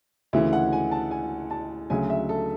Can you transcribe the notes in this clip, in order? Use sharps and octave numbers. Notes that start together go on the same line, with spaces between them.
D2 C#3 E3 E5
F#5
G#5
A5
G#5
A5
D2 C#3 F#3 G#5
E5
A4